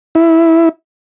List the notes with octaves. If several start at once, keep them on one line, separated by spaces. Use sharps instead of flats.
E4